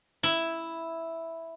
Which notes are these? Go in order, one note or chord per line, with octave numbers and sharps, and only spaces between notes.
E4